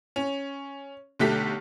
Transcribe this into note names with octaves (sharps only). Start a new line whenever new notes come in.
C#4
B1 D3 A3 G4 B6